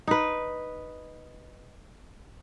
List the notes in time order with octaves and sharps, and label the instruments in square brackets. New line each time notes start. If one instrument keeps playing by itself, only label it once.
[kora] D#4 B4